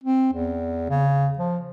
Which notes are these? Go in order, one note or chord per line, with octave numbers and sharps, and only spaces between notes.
C4
E2
C#3
F3